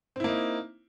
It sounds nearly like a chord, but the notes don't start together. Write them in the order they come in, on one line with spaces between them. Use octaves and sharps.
C4 E4 A#3 D#4